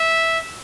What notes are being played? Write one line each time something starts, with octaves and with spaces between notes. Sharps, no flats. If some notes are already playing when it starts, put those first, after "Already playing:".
Already playing: E5